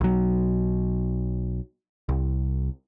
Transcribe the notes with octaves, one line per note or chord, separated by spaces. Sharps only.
B1 F#3
C2